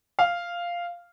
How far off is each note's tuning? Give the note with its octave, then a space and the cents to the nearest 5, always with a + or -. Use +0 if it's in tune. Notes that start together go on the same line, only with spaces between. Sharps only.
F5 -5